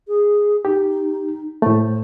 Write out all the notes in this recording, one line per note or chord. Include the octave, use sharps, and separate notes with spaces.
G#4
D#4 G4
A2 A3 C5